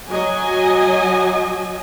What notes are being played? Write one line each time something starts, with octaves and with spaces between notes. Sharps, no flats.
F#3 D#5 G#5